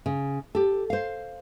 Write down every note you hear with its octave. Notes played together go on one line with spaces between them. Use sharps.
C#3
G4 A4
C5 F5